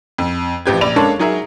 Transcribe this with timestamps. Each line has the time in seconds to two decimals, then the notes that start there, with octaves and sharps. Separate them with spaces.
0.18 F2
0.66 A1 F3 C4 G4 B4 G#6
0.81 A#1 D5 B5 F7
0.96 G#3 A#3 C#4 D4 A4 C#5
1.19 F#3 D#4 G#4 A#4 E5